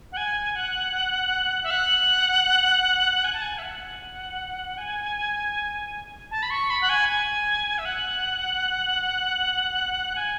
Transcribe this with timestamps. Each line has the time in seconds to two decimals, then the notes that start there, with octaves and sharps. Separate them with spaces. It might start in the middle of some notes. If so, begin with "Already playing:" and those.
0.12 F#5
0.17 G#5
0.56 F#5
1.63 E5
1.71 F#5
3.24 G#5
3.33 A5
3.41 G#5
3.58 E5
3.63 F#5
4.78 G#5
6.31 A5
6.43 B5
6.50 C#6
6.70 B5
6.81 F#5
6.89 G#5
7.09 G#5
7.78 E5
7.85 F#5
10.16 G#5